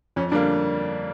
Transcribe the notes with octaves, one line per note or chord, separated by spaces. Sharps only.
F2 C#4
D3 G3 A#3 D4